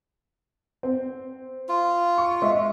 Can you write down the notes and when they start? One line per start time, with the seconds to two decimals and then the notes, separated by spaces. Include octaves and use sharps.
0.83 C4
1.69 F4
2.18 C#6
2.42 G#3 E5